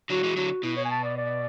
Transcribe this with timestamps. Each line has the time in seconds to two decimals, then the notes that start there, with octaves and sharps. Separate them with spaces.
0.10 D3 F#3 F#4
0.24 E3 G#3
0.36 D3 F#3 F#4
0.63 B2 E4
0.77 C#5
0.85 G#5
0.90 A5
1.03 D5
1.17 D5